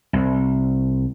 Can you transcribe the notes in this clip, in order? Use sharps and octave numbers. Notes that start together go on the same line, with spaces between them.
C2